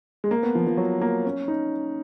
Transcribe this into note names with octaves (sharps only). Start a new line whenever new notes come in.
G#3
A#3
B3
F3
F3
F#3
A#3
C#4
D#4